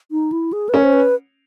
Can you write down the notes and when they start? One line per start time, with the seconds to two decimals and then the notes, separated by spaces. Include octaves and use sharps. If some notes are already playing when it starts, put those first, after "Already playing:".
0.11 D#4
0.32 E4
0.53 G#4
0.69 B4
0.73 C#4 A#4
0.84 C5
0.93 B4